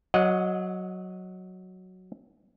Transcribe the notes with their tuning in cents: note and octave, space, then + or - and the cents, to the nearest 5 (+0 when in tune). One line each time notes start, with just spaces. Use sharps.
F#3 +0 D#5 +0 F#5 -35